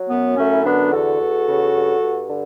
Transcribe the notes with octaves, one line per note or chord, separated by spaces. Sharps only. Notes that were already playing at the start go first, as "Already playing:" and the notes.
Already playing: F#3
F#2 B3
F#2 A3 C#4
E4
D3 B3 D4
E2 F#4 A4
E2
C#3
G2
G2
D3